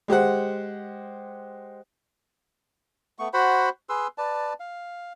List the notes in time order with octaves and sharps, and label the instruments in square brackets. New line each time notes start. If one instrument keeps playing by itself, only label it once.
[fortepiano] G#3 G4 C5 F#5
[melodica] A3 B3 C#6
F#4 C5 F#5 B5
G#4 B4 C6 E6
B4 D5 A5
F5